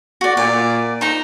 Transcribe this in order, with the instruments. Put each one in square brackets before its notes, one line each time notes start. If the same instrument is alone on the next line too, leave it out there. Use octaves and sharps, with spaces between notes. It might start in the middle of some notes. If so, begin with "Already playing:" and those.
[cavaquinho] F#4 D5
[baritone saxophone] A#2 [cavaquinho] D5
[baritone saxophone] D#4 [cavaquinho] C5 A#5